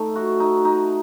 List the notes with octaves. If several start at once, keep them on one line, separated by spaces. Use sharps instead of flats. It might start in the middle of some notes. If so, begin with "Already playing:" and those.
Already playing: A3 D#4
F#4
D#4
D#4